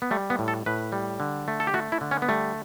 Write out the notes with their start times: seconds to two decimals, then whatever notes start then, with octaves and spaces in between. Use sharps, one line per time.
0.02 B3
0.11 G3 A3
0.30 B3
0.39 A2
0.48 A4
0.66 A2 B4
0.92 G3
1.20 D3
1.48 A3
1.60 A4
1.67 G4
1.74 A3 F#4
1.92 E4
2.01 D3
2.11 C#4
2.22 B3
2.28 G3 A3